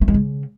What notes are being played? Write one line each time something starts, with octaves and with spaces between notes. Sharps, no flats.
A3
G#3
C#3